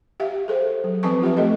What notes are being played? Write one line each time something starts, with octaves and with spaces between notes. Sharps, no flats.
G4 E5 F5
G#4 A4 C5
F#3
F3 C4 B4 G#5 A5 C#6
F4 G4 B4 E5
A3 A4 D#5